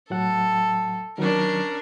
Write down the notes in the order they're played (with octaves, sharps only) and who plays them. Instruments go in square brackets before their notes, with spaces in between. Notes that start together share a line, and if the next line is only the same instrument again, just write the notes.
[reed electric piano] A2 F#3 F#5 [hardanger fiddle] A4
[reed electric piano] D#3 F#3 [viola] C#4 D4 [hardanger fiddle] A#4